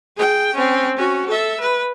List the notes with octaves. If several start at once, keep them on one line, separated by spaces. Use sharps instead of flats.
G#4 G5
C4 C#4
C#4 F#4
A4 E5
B4